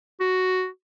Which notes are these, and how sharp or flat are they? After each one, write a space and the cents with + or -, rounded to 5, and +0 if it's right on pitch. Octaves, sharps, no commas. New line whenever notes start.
F#4 +5